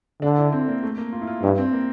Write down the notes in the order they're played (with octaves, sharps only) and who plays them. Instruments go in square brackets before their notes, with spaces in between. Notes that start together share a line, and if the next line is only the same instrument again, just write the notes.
[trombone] D3 [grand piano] D4
[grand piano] E4
C4
A#3
A3
A#3
F4
E4
F4
[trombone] G2 [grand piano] E4
[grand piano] C4
A#3